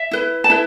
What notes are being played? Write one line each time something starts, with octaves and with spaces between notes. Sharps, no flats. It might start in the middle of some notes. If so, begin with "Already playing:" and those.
Already playing: E5
E4 B4
A5
E4 B4